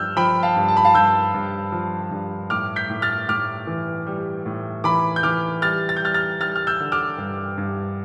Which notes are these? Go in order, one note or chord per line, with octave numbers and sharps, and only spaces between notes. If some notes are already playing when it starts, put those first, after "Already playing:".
Already playing: G2 F3 E6 F6 G6
F3 G5 B5
F5 A5
G2
A5
B5
F5 A5
G2 E6 G6
G2
F3
G2
A2 D6 F6
G6 B6
A2
F6 A6
A2 D6 F6
E3
G3
A2
E3 B5 D6
G6
E3 D6 F6
G3 F6 A6
A6
G6
G3 F6 A6
F6 A6
G3 F6 A6
F6
E6 G6
D3
D6 F6
G2
G2